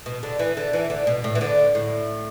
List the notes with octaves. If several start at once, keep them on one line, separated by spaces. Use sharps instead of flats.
B2
D3
E3
D3
E3
D3
B2
A2
E3
D3
A2